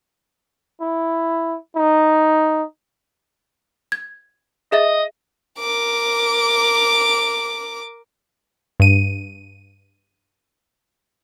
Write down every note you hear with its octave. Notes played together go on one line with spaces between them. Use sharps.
E4
D#4
G#6
G#4 D#5 E5 A6
A#4 D6
G2 D#7